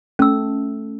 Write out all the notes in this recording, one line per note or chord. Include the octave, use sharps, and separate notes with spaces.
A3 C#4 E6